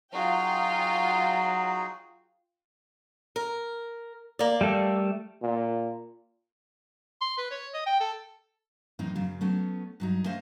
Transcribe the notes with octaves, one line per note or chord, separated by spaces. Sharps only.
F#3 D#4 F4 F#4 G#4 F5 G5
A#4
A#3 D5
G3 A3 A4
A#2
C6
B4
C#5
D#5
G5
A4
F#2 A2 E3 C4 D#4
F#2 C#3 F#3
F#3 A3 B3 C#4
G2 F#3 D#4
A3 C#4 C5 D#5 F5